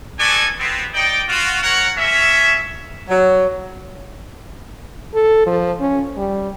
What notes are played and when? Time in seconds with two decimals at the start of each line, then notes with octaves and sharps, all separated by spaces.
0.19 B3 F#4 G#4 A4 D5 G#5
0.59 B3 C4
0.94 D#4 D5 G5
1.29 F4 F#4
1.63 A#4 C#5 F#5
1.97 A#3 C#4 C#5 E5
3.09 F#3
5.14 A4
5.46 F3
5.80 C#4
6.17 G3